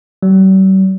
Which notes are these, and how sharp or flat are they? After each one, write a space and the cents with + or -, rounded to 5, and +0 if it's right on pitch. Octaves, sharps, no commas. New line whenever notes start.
G3 -45